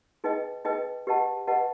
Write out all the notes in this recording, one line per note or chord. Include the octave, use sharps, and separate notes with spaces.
D#4 G#4 B4 D#5 G5
D#4 G#4 B4 D#5 G5
G4 B4 D#5 F#5 A5
G4 B4 D#5 F#5 A5